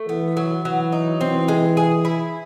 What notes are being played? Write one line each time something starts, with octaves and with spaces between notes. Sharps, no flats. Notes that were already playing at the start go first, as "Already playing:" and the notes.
Already playing: A3
E3 B3
F#3
E3 F#3
D#4
E3 C4
G#3
G#4
E4